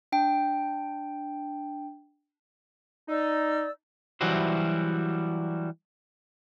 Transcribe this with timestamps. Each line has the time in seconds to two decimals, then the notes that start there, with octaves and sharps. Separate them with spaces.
0.12 D4 G5
3.08 D#4 D5 E6
4.21 E3 F#3 G3 E4 F#4 C5